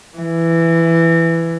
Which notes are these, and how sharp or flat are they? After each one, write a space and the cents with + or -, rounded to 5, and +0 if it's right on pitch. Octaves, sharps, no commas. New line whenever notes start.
E3 +10